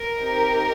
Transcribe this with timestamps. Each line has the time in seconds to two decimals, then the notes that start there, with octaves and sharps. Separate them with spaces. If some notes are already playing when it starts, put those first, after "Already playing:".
Already playing: A#4
0.17 C4 D#4 G4